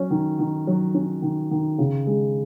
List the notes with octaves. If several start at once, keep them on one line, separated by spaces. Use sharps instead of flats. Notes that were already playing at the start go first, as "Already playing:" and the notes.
Already playing: F#3 C#4
D#3
D#3
F#3
C#4
D#3
D#3
C#3
G#3